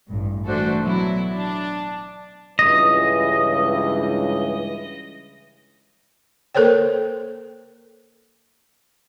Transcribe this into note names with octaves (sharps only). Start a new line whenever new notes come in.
A1 G2
E3 A3 D4 F#4 A4 C5
B2 F#3 E4
D4 A5
C#2 G2 E3 D#5
A#3 A4 A#4 C5 C#5 G5